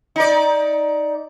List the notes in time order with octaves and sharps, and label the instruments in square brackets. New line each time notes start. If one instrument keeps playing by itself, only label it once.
[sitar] D#4 D5